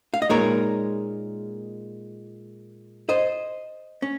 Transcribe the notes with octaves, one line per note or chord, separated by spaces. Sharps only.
F5
D#5
A#2 G#3 D#4 A#4 C#5
C5 D#5
C#4